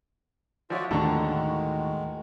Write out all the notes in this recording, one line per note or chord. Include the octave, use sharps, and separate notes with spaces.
F3 F4 F#4 C#5 D5 E5
D#2 A2 D3 D#3 G#3 F#4 A#5 C#6